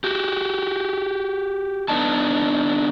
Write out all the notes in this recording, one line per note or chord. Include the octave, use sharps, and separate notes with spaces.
F#4 G4
D3 B3 D4 D#4 A5